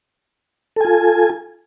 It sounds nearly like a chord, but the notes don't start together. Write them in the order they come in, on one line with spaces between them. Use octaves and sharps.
A4 G#5 F4